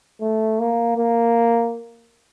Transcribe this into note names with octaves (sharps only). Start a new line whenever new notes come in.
A3
A#3
A#3